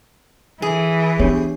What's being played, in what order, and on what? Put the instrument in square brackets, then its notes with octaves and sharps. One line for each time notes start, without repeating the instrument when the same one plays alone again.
[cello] E3 [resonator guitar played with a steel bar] G#4
[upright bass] B3 [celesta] D4 G4 C#5